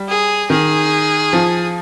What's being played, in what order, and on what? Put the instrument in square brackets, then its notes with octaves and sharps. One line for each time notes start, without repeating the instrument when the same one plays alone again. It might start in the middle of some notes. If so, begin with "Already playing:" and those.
Already playing: [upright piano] G3
[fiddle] G#4
[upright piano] D#3 [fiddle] G#4
[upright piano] F3